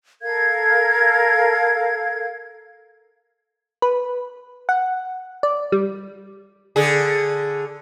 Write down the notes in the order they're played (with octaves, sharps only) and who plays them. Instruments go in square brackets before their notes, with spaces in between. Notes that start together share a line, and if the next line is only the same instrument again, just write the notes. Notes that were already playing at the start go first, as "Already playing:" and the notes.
[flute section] A4 A#4 F5 G#6
[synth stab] B4
F#5
D5
G3
[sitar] D3 G#4